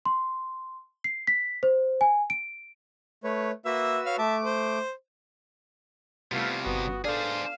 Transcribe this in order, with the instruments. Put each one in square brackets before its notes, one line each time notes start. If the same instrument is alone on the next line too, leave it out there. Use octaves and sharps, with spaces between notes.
[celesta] C6
C7
B6
C5
G#5
D7
[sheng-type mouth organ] A3 B4 C#5
[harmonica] A#3 E5 [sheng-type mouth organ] F#4 B4 E6
[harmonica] C#5 F5
[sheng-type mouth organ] A3 D6 [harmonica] E5 A5
[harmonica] C5
[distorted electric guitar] C3 G3 [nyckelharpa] A3 F4 [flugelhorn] B3 [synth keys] F6 G#6 C7
[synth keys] G1 D#6 [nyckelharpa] B3 [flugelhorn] F#4
[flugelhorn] D4 [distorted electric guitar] G#4 C5 [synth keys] A4 B4 D5 [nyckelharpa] F5